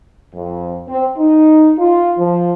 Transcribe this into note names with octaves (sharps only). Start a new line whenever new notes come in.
F2
C4
D#4
F4
F3